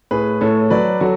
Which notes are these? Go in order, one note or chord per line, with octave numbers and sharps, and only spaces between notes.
A2 G#4 B4
A2 A4 C#5
F#3 B4 D5
F#3 F#4 A4